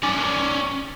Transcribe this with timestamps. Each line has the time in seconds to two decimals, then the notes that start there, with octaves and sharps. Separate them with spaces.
0.03 C#4 D5